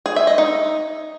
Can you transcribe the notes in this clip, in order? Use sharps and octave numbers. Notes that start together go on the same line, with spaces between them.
G#4
E5
D#5
D#4